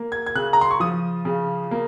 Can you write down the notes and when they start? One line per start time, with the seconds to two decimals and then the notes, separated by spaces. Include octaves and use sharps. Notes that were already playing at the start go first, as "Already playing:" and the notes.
Already playing: A#3
0.12 G#6
0.26 G#6
0.35 C#3 F#6
0.53 A#5
0.61 C6
0.71 C#6
0.80 F3 D#6
1.25 C#3
1.71 A#3